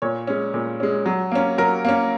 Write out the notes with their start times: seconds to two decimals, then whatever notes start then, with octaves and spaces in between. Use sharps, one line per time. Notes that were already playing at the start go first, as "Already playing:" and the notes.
0.02 A#2 C#5
0.27 G#3 C#4
0.54 A#2
0.80 G#3 C#4
1.06 F#3
1.32 A#3 C#4
1.58 F#3 A#4
1.85 A#3 C#4